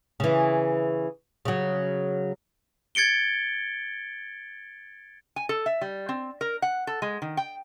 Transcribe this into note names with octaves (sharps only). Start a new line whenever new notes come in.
C#3 E3
C#3 F#3
G#6 A6 C#7 D7 G7
G#5
A4
E5
G3
C4
A#4
F#5
A4
G#3
D#3
G5